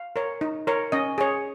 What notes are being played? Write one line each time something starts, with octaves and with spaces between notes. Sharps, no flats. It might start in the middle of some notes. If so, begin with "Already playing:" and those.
Already playing: F5
A#4 C#5
D#4
A#4 C#5
C#4 D#5
G#4 C#5